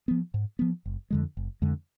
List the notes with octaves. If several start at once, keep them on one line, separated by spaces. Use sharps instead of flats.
F3 B3
G#2
F3 B3
F#1
F2 D3 G#3
F#1
F2 D3 G#3